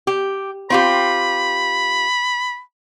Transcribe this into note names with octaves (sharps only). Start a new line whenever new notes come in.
G4
C4 F4 G4 B5